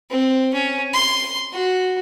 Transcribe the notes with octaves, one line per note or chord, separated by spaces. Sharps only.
C4
C#4
C6
F#4